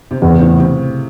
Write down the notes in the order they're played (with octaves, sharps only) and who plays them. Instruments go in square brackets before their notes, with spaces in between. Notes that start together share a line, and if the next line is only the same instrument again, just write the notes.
[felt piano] C3
[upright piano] E2 [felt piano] C#3
[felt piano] C3
A2
C3